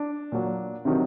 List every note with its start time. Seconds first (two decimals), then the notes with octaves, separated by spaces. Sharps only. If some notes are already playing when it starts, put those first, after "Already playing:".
Already playing: D4
0.32 A#2 F#3
0.85 C3 D#3 F#3